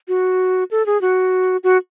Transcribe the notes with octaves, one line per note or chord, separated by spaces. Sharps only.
F#4
A4
G#4
F#4
F#4